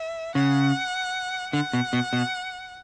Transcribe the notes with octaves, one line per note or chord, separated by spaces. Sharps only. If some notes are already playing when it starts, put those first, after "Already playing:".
Already playing: E5
C#3 F#5
D3 F#5
B2
B2
B2